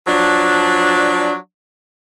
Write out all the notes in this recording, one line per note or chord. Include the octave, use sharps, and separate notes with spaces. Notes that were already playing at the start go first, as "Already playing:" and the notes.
F3 F#3 D4